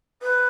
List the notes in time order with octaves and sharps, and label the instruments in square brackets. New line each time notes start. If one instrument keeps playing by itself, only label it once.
[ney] B4